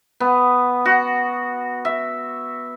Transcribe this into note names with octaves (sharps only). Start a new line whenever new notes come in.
B3
F#4
E5